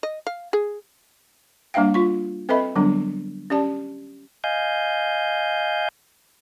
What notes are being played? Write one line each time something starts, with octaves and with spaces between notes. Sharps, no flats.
D#5
F5
G#4
G3 A#3 D4 E5 F5 G5
F4 C#6
C4 A4 B4 D#5 E5 B5
D3 F#3 G3 B3 D4
C#4 G4 D5 A5
D#5 F5 G#5 G6